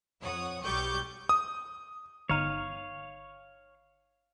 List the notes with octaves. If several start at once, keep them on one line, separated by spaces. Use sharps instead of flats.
F2 C#5 F#5 D#6
B1 G3 G4 C#6 D6 G6
D#6
G1 D#4 C#5 F5 D#7